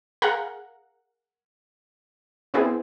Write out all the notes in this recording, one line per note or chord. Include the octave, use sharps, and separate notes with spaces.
G#4 A#4 F5 F#5 A#5
B3 C4 E4 G#4